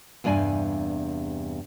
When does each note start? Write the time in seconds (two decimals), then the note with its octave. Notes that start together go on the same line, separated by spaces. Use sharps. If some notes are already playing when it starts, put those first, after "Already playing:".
0.24 E2 G2 C3 D5 G#5